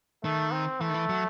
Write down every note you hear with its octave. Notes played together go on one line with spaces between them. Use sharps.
D#3 A3
C4
E3 A3
D#3
E3
F#3